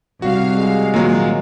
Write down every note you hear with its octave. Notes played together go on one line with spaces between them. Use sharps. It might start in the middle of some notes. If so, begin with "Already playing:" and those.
C2 F#4 F5
G#3
A#2 D#3 F#3 A#3